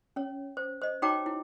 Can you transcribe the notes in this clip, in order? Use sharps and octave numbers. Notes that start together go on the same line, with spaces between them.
C#4 C#5
C5
C5 D#5
D#4 F#4 C#5 G5 A#5 D6
E4